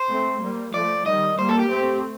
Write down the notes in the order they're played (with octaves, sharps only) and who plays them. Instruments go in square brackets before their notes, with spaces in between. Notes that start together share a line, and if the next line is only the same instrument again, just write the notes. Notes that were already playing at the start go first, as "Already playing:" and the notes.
Already playing: [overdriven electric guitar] C5
[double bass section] A3 C4
G3 A#3
[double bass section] F3 A3 [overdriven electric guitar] D5
[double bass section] D#3 G3 [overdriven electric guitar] D#5
[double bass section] G3 A#3 [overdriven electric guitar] C5
[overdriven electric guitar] A4
G4
[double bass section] A3 C4